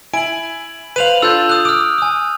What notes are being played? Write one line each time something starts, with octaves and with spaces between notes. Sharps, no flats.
E4 G#5 D7 F#7
B4 C5 F5 D#7 F7 F#7
D4 F4 A4 E6 F#6 G6
D#6 F#6
D6 D#6 F6
G#5 D#6